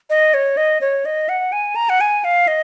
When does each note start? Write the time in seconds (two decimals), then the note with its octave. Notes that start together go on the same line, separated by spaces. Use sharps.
0.10 D#5
0.34 C#5
0.57 D#5
0.81 C#5
1.05 D#5
1.29 F#5
1.52 G#5
1.76 A#5
1.89 F#5
2.01 G#5
2.24 F5
2.48 D#5